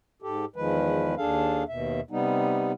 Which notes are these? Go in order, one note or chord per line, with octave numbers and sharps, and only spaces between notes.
G#2 G4 A4
E2 D#3 F3 G#3 B4
D#2 D4 G#4 A4 F5
D#2 B2 E5
C3 G3 B3 D#4